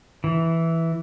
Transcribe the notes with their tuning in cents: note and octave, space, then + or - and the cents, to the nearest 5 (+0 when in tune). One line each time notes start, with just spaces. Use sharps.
E3 -5